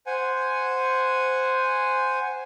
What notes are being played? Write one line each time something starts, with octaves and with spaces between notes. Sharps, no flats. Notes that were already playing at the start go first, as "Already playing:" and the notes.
C5 F#5 G#5